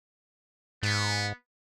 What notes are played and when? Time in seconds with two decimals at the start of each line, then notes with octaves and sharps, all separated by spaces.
0.83 G#2 B3